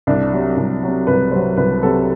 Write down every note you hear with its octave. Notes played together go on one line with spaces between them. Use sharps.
C2 D4
C3 F#3
C2
C3 F#3
C2 B4
C3 F#3 C5
C2 B4
C3 F#3 A4